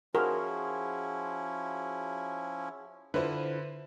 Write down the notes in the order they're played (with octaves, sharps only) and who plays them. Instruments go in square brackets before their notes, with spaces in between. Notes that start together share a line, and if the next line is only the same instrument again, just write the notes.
[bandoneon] F3 C#4 E4 [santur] F#4 G#4 C5 [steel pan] A#4
[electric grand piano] D3 [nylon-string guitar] E4 F4 [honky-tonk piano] B4 C5